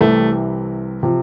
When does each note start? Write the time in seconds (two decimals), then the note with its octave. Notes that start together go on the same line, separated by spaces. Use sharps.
0.01 C2 C3 E3 A3
1.03 C3 F3